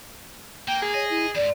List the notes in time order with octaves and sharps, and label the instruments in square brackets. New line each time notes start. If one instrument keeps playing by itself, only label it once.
[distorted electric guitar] A#3 [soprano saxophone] G5
[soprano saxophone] G#4
[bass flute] C#5 [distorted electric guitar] D#5
[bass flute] E4
[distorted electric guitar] E2 G#2 [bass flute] D5